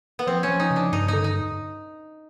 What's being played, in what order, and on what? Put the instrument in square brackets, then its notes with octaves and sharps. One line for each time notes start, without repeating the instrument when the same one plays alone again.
[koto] B3
[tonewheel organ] F3 [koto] C4
[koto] C#4
[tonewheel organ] F3
[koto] D#4
[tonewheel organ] C#3
[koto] D4
[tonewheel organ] G2 [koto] D#4
[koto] D#4
[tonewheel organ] D3
[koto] D#4